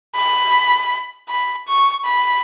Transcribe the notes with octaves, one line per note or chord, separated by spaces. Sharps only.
B5
B5
C#6
B5